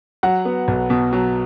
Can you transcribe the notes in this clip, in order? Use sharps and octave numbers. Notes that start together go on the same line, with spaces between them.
F#3 F#5
B3
B1
B2
F#3